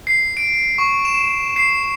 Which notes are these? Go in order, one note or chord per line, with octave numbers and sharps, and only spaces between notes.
C7
D7
C#6
E7
C7